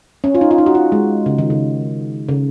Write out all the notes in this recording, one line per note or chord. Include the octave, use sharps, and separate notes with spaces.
C#4
F4
D#4
F4
D#4
F#4
F4
G#3
C#3
D#3
C#3
C#3